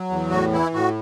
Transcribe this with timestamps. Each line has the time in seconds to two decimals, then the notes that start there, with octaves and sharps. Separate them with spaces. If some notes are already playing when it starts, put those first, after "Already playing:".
Already playing: F#3
0.10 E2
0.30 A2 F#4
0.52 E3 E4
0.73 A2 F#4